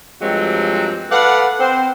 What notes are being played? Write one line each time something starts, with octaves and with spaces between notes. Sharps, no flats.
G2 F3 F#3 G#3 A#3 C4
A4 B4 D5 F5 F#5
C4 C5